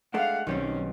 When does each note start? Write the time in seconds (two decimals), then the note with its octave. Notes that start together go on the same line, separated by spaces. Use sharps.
0.14 G#3 A3 D4 F5 F#5
0.47 B1 D#3 G3 C4 C#4